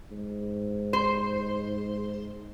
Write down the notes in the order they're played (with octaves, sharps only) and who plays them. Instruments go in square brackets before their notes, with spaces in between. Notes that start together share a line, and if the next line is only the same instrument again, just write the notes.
[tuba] G#2
[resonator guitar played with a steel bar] C5